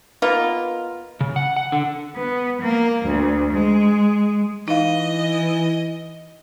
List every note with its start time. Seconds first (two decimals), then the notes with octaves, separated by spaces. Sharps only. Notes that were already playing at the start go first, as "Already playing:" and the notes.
0.22 A#3 B3 D#4 F4
1.21 C#3
1.36 F#5
1.57 F#5
1.72 D3
2.15 B3
2.61 A#3
3.05 D2
3.53 G#3
4.68 E3 D#4 D#5 F5